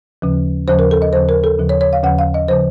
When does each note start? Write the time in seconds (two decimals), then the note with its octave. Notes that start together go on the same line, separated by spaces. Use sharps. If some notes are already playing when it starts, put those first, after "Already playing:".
0.22 D#2 C#3 F3
0.68 D#2 C#3 F3 C5
0.79 A#4
0.91 A4
1.02 D#5
1.13 D#2 C#3 F3 C5
1.29 A#4
1.44 A4
1.59 D#2 C#3 F3
1.69 C#5
1.81 C#5
1.93 F5
2.03 D#2 C#3 F3 F#5
2.19 F5
2.34 D#5
2.48 C#3 F3 C5